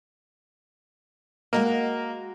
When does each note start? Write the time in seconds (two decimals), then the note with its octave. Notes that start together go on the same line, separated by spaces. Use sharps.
1.53 G#3 A#3 F#4 D#5